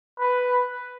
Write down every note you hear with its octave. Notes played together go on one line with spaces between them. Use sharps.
B4